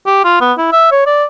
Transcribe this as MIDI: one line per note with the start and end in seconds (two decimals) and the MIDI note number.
0.06 0.23 67
0.25 0.37 65
0.41 0.53 59
0.58 0.72 64
0.72 0.91 76
0.92 1.05 73
1.06 1.24 74